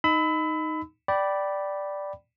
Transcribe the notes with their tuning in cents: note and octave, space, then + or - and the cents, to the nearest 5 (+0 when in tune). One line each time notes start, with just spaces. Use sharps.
D#4 +0 B5 +25 E6 -25
D5 +0 G5 -20 B5 -5